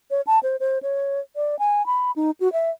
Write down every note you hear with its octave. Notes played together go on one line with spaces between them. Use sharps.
C#5
A5
C5
C5
C#5
D5
G#5
B5
D#4
F#4
E5